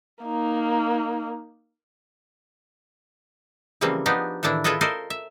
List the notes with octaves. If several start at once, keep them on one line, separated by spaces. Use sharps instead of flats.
A#3 D#4
C#3 E3 F3 G3 A#3 C4
F3 B3 D4 D#4 G4
A2 D#3 E3 D4 E4
E4 F4 G#4 A4 B4 D#5
A4 A#4 C5 D5 D#5 F5
E5